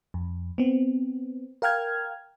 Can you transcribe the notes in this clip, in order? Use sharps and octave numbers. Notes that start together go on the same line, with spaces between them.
F2
B3 C4
A#4 F5 G5 F6 G#6